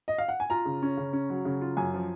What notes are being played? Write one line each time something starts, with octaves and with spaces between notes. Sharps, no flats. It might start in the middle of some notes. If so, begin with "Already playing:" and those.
D#5
F5
F#5
G#5
F4 A#5
C#3
C#4
C#3
C#4
F#3
C#3
F4
F#2 G#5
F3